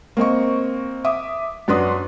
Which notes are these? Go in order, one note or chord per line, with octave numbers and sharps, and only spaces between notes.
A#3 C4 D#5 C#6
E5 D6 D#6
F#2 D4 F#4 B4 C6 D#6